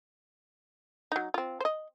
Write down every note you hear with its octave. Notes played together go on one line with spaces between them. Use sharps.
F#3 D#4
C4 F4
C5 D#5